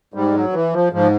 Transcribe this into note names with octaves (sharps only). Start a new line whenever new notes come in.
G#2 G3
F#3
E3
F3
G#2 F3